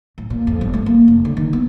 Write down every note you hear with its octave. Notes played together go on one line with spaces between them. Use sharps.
A2
A#2
F2
G1
A3
A#3
F1
D3
D#3
B3